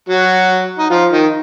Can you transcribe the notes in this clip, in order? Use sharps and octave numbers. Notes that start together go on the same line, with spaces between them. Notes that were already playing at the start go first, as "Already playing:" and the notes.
F#3 F#4
D#4
F3 F4
D#3 D#4